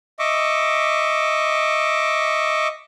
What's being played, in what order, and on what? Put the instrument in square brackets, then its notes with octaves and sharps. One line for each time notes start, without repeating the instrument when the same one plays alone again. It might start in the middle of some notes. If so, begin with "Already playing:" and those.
[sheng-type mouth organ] D#5 E5 C#6 D6